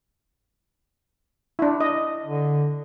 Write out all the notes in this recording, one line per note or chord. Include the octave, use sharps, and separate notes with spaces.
D4 E4
D#5
D3